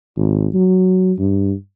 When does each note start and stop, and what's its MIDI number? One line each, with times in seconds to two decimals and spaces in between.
0.17 0.47 32
0.54 1.13 54
1.19 1.53 43